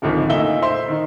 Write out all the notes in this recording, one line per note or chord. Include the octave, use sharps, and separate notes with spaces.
G#1 C#2 D3 D#3 F3
A#2 A3 D#4 E5 G7
C5 E5 C6
D#3 D#4